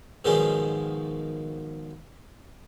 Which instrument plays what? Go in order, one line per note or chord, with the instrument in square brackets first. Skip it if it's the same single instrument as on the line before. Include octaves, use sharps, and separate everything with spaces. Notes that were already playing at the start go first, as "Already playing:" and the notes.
[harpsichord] G#2 B2 D#3 F3 F#3 G#3